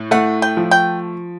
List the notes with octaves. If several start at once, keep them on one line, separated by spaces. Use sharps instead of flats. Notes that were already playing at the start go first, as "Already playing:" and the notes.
Already playing: A2
A3 F#5
G5
F3
G5